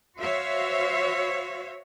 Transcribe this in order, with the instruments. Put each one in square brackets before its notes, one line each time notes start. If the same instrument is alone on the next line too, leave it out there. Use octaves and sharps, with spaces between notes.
[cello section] F#4 C5 C#5 E5 F5